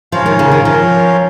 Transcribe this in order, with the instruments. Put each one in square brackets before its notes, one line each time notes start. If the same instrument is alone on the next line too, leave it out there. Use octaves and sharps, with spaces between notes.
[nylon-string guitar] F3 [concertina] C#4 F4 A#4 C#5 F5
[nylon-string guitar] D#3
C#3
D#3
[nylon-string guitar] F3 [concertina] C#4 F4 A#4 C#5 F5